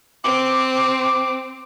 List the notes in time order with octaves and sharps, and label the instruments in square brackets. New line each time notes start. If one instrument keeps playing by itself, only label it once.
[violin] C4 [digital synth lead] D6